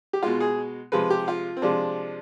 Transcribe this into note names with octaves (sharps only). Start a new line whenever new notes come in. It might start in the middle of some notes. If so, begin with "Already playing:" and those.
G4
B2 G#3 F4
G#4
C3 F3 G#3 B4
G4
F4
C4
C3 F3 G#3 D4